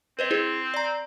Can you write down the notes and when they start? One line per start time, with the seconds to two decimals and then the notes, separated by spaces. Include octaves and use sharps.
0.19 C4 B4 C5 D#5
0.31 E4 G#4 C5
0.74 D5 A#5